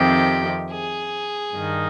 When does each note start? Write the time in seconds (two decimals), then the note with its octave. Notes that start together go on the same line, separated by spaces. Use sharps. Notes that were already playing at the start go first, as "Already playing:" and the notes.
Already playing: F2 C3 D#3 G4
0.71 G#4
1.54 G2 D#3